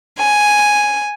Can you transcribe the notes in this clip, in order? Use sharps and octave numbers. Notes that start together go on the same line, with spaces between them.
G#5